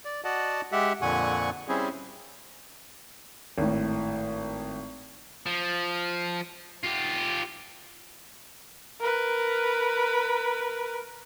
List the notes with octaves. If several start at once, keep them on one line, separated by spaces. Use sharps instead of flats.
D5
F#4 D5 D#5 F#5 A5
G#3 G4 E5 F#5
F2 A#2 D3 F#5 G#5 C#6
G3 C4 C#4 E4 G#4
G#1 A2
F3
F4 G4
A#4 B4